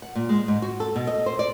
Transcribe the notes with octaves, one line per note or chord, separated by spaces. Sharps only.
F#5
A#2
G#3
G#2
F#4
A4
B2
D#5
C5
D5